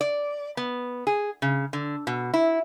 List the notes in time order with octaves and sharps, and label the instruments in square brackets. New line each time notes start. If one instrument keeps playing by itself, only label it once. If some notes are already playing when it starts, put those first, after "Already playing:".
[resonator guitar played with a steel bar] D5
B3
G#4
C#3
D3
B2
E4